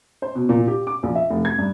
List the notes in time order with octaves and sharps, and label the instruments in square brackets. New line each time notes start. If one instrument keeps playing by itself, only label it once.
[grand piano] C5
B2
A#2
G4
D6
A#1
E5
F1
G#6
G2